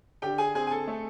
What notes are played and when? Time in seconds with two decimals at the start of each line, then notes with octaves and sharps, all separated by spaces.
0.22 D3 G4 G5
0.38 G#4 G#5
0.55 C4 G#4 G#5
0.67 G#5
0.71 A4 A5
0.88 A3